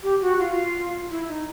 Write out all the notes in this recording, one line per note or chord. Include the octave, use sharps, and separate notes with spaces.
G4
F#4
F4
E4
D#4